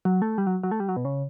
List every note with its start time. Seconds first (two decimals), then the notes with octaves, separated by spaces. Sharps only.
0.05 F#3
0.22 A3
0.38 G3
0.47 F#3
0.63 F#3
0.71 A3
0.80 G3
0.89 F#3
0.97 B2
1.05 C#3